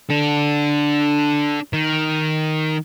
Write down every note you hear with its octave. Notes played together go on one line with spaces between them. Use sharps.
D4 A4
D#3